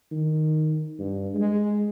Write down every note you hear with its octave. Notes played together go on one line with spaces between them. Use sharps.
D#3
G2
G#3